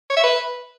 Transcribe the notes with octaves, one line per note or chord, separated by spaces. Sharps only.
C#5
E5
B4